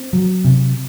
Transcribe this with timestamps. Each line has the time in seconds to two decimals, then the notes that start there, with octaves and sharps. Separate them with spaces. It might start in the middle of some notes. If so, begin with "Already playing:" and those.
Already playing: C4
0.13 F#3
0.45 C3